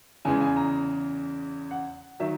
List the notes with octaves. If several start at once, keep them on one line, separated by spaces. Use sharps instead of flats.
E2 C#3 E3 G#3 G#5
G#5
A#5
F#5
D#3 F#3 E5